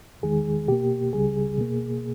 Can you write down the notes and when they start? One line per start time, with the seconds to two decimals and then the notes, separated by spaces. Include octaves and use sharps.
0.23 E2 D#3 G#3 G#4
0.68 B2 A#3 G4
1.12 C#2 C#3 G3 G#4
1.58 B2 A#3